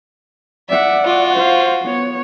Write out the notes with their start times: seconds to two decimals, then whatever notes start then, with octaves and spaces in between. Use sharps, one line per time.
0.69 D5 E5 F#5
1.05 F4 F#4
1.37 C5 F5
1.84 B3 C#5